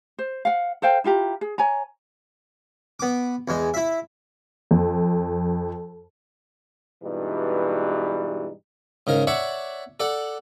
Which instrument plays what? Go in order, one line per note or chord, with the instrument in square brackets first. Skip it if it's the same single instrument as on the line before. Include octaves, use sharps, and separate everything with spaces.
[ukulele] C5
F5 F#5
A4 C5 F5 G5
E4 F4 G4 A#5
G#4
C#5 G#5 A#5
[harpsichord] B3 D6
E2 G#3
E4 E5
[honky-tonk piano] F2
[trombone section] G2 B2 E3 G3 G#3 D#4
[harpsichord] G#2 C#3 A#4
C#5 D5 E5 F#5 A5 C#6
A4 D5 F#5